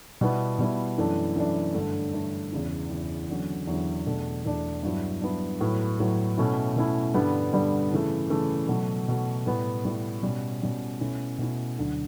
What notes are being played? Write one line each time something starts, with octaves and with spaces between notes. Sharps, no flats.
B2 G3 B3 E4
B2 G3 B3 E4
F#2 E3 A3 D4
F#2 E3 A3 D4
G2 D3 A3
G2 D3 A3
E2 C#3 E3
E2 C#3 E3
E2 D3 F#3 C#4 E4
E2 D3 F#3 C#4 E4
E2 B2 A3 D4
E2 B2 A3 D4
G2 F#3 B3 E4
G2 F#3 B3 E4
A2 F#3 B3
A2 F#3 B3
B2 A3 C#4 E4
B2 A3 C#4 E4
G2 D3 G3 B3
G2 D3 G3 B3
C#3 E3 A3
C#3 E3 A3
B2 F#3 A3
B2 F#3 A3
A2 G3 B3
A2 G3 B3
B2 G3 C#4
B2 G3 C#4
B2 A3 C#4 E4
B2 A3 C#4 E4
D2 D3 F#3